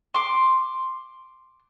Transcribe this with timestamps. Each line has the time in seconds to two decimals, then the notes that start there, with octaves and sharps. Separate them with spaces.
0.14 C6 D6